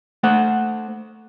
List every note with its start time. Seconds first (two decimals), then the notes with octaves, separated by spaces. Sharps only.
0.23 A3 C5 F#5